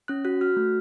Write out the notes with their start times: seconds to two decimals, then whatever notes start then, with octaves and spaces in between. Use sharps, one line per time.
0.08 C#4 F#6
0.25 F#4 F#6
0.41 F#4 F6
0.57 A3